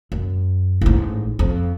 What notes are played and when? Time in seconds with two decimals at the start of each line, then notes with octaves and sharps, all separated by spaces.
0.12 F#2
0.81 A1 G#2
1.39 F2